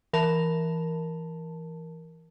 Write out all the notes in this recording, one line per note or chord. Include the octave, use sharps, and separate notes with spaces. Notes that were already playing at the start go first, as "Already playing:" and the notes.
E3 A#4 A5